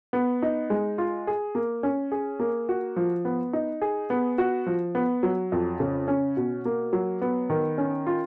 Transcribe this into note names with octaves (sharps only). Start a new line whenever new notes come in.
B3
D#4
G#3
F4
G#4
A#3
C#4
G#4
A#3
F#4
F3
B3
D#4
G#4
B3
F#4
F3
B3
F#3
F2
C#3
C#4
B2
A#3
F#3
B3
D#3
C#4
F4